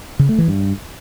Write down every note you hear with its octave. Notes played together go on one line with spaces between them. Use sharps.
C#3
A3
E3
G2